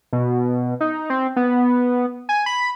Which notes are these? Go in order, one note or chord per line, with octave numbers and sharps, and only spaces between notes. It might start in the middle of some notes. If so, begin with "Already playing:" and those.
B2
D#4
C4
B3
G#5
B5